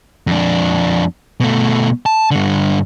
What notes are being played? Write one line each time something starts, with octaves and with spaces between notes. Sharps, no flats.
F2 D4
B2 A3
A5
G2 D3